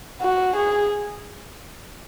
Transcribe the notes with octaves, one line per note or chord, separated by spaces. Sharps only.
F#4
G#4